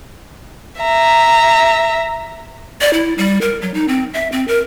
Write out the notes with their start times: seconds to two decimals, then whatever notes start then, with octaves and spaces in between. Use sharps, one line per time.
0.81 E5 A#5
2.81 D5
2.93 E4
3.18 G3
3.41 A#4
3.62 F#3
3.74 D#4
3.88 C4
4.14 E5
4.32 C4
4.48 A#4